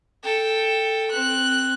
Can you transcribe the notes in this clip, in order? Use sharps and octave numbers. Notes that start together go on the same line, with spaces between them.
A4 G5
C4 F#6